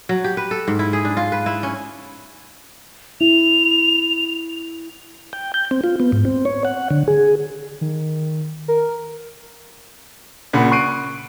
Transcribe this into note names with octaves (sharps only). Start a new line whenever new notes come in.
F#3
G4
B4
A4
G#2
E4
G#4
D4
F4
B4
E4
C#4
E4 F7
G5
G6
C4
F4
B3
G#2
C4
C#5
F#5
D3
G#4
D#3
A#4
A#2 C#3 F#5 B5
C#6 F#6 C7 D7 D#7